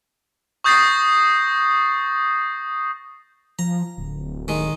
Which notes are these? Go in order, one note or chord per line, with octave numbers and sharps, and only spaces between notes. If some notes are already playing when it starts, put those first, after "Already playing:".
C#6 D#6 G6 A6 A#6 C7
F3 A#5
D1
D#3 G#3